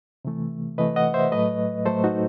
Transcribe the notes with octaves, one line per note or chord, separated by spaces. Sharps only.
C3 E3 A3
C3 E3 A3 B4 D#5
D#5 F#5
C5 E5
A2 F#3 A3 B4 D#5
A2 F#3 A3 A4 C5
D#4 F#4